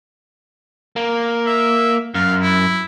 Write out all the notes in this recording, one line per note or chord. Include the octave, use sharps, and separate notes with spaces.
A#3
E5
F#2 F5
E4